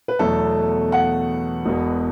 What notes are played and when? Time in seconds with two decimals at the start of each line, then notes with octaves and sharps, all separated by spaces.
0.08 B4
0.19 E2 B2 F#3 A3 A4
0.92 F#5
1.66 E1 E2 B2